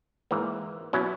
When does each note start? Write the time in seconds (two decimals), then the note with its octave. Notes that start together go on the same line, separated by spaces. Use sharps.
0.31 G#2 E3 A#3
0.93 B2 F#3 C#4 E4